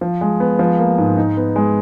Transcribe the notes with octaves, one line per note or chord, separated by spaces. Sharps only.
F3
G#3
B3
F3
A#3
G#2
D#4
B3
G#3